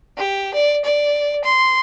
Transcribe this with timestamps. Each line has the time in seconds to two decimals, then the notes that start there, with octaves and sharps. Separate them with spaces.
0.18 G4
0.54 D5
0.84 D5
1.44 C6